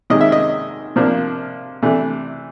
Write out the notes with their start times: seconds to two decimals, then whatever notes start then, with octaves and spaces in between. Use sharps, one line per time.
0.10 C3 D#3 G#3 C#4 D#5
0.21 E5
0.32 D#5
0.96 C3 F3 A#3 D4
1.82 C3 E3 A3 D4